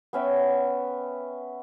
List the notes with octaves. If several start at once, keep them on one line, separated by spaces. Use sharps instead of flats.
B3 C#4 E5 G5